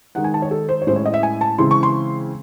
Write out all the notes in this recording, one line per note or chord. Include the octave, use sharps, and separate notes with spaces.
D#3 G#3 D#4 F#5
G#5
A5
C#5
A4
C5
C#5
A2 G#3 C#4 E4 C5
C#5
D#5
E5
G#5
A5
C#3 E3 G#3 C4 E4 C6
C#6
C6